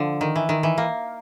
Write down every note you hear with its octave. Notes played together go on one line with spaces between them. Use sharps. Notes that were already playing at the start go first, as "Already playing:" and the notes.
Already playing: D3 F3
D#3
E3
D#3
E3
A#3